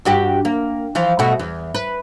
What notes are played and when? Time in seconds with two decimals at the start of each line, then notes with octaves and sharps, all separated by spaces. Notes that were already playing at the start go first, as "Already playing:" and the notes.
0.05 G2 F#4 G4
0.45 A#3
0.95 E3 F3 F4
1.19 B2 A3 F#4
1.39 E2
1.74 B4